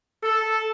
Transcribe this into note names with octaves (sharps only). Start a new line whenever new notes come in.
A4